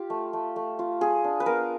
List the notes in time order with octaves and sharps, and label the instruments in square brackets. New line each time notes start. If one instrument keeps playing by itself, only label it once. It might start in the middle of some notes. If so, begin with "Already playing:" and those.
Already playing: [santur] F4 G4
A3
A3
A3
F4
F4 G#4
D4
B4
B3 A#4